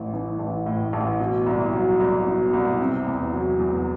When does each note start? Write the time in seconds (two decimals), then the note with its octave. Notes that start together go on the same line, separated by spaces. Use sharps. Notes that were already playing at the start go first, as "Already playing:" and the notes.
Already playing: A1 A2
0.14 E3
0.39 A1
0.66 A2
0.93 A1
1.20 B2
1.46 C2
1.73 F#3
2.00 C2
2.26 B2
2.53 C2
2.80 C3
3.06 E2
3.33 F#3
3.59 E2